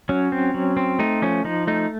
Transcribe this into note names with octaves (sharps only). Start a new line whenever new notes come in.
F#3 C#4
C4
F#3
C4
A3 D#4
F3 C#4
F3 D#4
A3 D#4